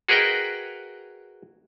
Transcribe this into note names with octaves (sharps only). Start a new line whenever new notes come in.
F#4 G#4 A#4 B4 D#5 G5